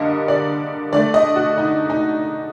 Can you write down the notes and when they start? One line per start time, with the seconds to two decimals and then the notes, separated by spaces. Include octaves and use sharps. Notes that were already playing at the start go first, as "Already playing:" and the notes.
Already playing: D3 G3 A#3 D#5
0.28 D5
0.93 D3 A3 D5
1.14 D#5
1.36 F#4
1.58 D#4
1.90 D#4